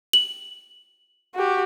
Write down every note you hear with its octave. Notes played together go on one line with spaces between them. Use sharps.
F#7
F#4 G4